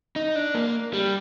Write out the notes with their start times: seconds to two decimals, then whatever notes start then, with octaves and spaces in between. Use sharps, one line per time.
0.16 D#4
0.36 D4
0.54 A#3
0.93 G3